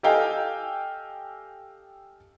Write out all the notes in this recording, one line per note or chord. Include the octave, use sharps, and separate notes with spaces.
G4 A4 D#5 F5 G5 G#5